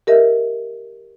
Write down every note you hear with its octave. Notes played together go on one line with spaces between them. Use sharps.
G4 A#4 D#5 E5